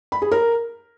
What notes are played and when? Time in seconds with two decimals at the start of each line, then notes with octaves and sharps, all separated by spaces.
0.12 B5
0.22 G#4
0.32 A#4